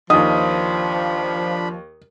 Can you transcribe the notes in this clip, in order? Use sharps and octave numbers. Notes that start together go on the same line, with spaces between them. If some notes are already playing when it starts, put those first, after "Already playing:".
D#2 F3 D4 D#4 B5 D#6